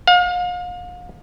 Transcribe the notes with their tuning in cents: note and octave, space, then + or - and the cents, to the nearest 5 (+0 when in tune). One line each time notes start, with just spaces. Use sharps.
F5 +40